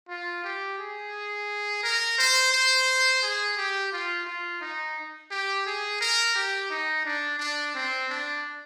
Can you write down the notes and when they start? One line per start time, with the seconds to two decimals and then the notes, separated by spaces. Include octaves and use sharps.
0.08 F4
0.44 G4
0.78 G#4
1.83 A#4
2.18 C5
2.52 C5
3.22 G#4
3.57 G4
3.92 F4
4.26 F4
4.61 D#4
5.31 G4
5.66 G#4
6.01 A#4
6.35 G4
6.70 D#4
7.05 D4
7.39 D4
7.75 C4
8.09 D4